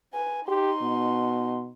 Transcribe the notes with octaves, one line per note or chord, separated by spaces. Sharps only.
B4 G#5
D#4 G4 C6
B2